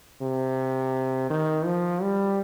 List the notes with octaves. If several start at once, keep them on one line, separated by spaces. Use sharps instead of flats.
C3
D#3
F3
G3